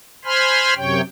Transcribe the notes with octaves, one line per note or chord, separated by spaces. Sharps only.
C5 G#5 B5 C6 F6
F#2 C3 C#5 G5